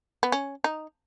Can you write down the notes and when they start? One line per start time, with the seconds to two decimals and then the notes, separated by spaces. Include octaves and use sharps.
0.23 B3
0.32 C#4
0.64 D#4